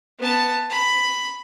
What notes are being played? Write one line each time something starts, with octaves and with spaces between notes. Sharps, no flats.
B3 A5
B5